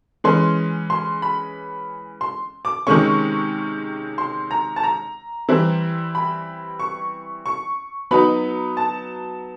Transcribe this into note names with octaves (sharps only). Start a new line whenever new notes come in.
E3 G#3 C#4 C6
C6
B5
C6
D6
C3 D#3 G#3 C#4 C#6
C6
A#5
A5
A#5
E3 G3 C4 E4
B5
C#6
C#6
F#3 B3 D#4 B5
A5